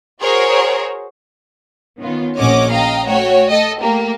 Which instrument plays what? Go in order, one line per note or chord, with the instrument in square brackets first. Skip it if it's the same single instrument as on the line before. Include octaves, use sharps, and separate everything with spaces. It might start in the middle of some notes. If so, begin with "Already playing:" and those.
[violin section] F#4 G#4 A#4 C5 C#5
[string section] D#3 B3 C#4 F4
A#1 C#4 C#5 D#5 F#5 D6
D#5 F5 G5 A#5
A3 F#4 C#5 G5
A4 D#5
A3 A#3 G4